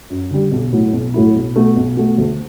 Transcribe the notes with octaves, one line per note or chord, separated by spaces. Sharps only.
F#2
D3 G3
B1
A2 F#3 A3 E4
B1
A2 F#3 A3 E4
B1
B2 A3
B1
B2 A3
D2